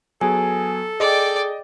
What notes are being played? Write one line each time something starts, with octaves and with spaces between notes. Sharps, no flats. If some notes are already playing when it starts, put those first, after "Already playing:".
F#3 B3 G#4 A4 G#5
G#4 D5 D#5 G5